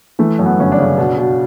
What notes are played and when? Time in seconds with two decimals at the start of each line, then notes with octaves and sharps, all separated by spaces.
0.19 E3 A3
0.39 F#2
0.46 B3
0.59 G1 C#4
0.72 D4
0.78 C#3
0.98 B2
1.17 B2